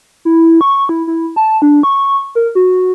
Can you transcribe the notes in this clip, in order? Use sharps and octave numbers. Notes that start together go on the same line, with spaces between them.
E4
C#6
E4
E4
A5
D4
C#6
A#4
F#4